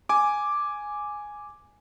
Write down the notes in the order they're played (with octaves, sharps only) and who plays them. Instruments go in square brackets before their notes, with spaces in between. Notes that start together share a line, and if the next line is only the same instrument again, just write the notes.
[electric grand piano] G#5 D6